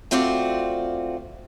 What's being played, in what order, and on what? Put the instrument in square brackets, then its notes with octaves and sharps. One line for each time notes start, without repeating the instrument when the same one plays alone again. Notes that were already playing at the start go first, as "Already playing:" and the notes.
[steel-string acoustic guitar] A3 C4 F4 F#4 D5